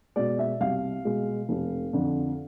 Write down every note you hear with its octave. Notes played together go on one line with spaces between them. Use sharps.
B2 G#3 D5
E5
C2 F5
B2 G#3
F1
F2 D3